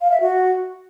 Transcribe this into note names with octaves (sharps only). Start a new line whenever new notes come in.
F5
E5
F#4